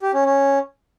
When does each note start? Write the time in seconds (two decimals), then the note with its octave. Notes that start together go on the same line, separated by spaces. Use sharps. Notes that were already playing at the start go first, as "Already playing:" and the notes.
0.02 G4
0.14 C#4
0.25 C#4